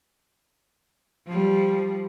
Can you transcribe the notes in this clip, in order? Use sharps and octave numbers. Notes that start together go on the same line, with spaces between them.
F3 G3